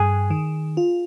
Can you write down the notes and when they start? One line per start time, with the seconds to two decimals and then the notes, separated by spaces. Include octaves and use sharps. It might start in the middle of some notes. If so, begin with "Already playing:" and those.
Already playing: G2 G#4
0.30 D#3
0.77 F4